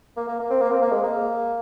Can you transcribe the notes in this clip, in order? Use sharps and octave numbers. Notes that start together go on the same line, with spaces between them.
A#3
A#3
A#3
C4
A#3
C4
A#3
G#3
A#3